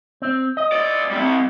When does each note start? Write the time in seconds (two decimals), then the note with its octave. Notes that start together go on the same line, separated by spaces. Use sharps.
0.22 C4
0.57 D#5
0.72 C2 D5
1.11 G3 C4